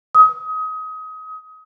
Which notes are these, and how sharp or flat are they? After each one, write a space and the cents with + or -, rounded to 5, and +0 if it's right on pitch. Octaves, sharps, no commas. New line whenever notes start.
D#6 +25